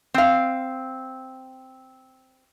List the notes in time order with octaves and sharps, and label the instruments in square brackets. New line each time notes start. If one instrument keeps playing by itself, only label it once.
[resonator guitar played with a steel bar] C4 F5